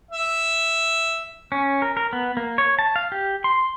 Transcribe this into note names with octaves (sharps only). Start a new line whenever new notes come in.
E5
C#4
A#4
A#4
B3
A#3
C#5
A5
F5
G4
C6